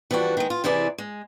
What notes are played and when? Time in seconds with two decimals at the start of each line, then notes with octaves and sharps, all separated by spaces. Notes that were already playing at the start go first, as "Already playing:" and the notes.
0.11 E3 F3 G3 D4 F#4
0.37 D#3 G#3
0.50 F4
0.64 C3 E3 E4 G#4 D5
0.98 G#3